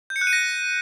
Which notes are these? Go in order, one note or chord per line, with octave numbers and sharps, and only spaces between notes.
G6
C#7
F#6
D#7
A#6